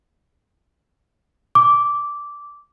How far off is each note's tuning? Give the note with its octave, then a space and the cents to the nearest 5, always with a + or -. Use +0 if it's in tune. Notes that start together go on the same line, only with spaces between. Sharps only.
D6 -10